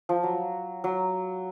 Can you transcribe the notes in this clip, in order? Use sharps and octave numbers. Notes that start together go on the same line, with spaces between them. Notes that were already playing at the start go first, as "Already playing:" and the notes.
F3
F#3
F#3